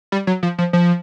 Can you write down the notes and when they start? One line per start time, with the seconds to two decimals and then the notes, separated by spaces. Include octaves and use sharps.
0.12 G3
0.27 F#3
0.43 F3
0.58 F3
0.73 F3